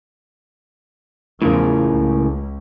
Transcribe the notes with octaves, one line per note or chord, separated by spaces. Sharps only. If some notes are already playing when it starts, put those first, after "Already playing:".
E2 A2 C#3 F3 A#4
C#2